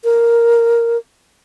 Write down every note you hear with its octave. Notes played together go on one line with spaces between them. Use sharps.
A#4